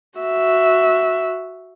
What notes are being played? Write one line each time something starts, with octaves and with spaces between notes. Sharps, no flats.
F#4 E5